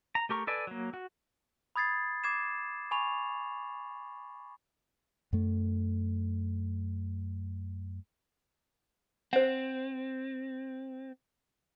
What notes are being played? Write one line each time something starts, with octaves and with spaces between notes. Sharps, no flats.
A#5
A3 G4 A#4 C#6
A4 B4 D5 G#5
F#3 A#3
F#4
B5 D#6 G#6 A6 C7
D6 G#6 C7 E7
G#5 B5 C#6 F7
F#2 A3
C4 C5 F#5